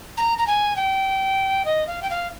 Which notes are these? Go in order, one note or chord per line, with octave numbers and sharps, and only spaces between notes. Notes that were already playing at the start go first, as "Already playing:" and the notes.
A#5
A#5
G#5
G5
D#5
F5
G5
F5